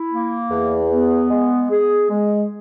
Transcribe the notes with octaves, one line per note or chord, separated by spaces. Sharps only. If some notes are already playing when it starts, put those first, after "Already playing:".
Already playing: E4
A#3
E2
B3
G#3
G#4
G#3